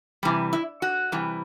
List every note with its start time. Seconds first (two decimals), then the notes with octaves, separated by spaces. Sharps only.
0.23 C3 E3 G3
0.53 E4
0.82 F#4
1.12 C3 E3 G3